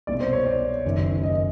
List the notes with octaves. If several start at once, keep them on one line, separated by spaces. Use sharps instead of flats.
C2 B2 D5
C5
C#5
D5
F#1 F#2 D#3
D#5